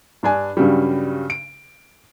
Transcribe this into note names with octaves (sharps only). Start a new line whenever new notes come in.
G2 D4 G#5
G2 C#3 F#3 G3
D7